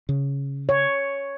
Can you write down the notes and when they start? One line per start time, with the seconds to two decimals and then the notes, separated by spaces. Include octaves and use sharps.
0.09 C#3
0.69 C#5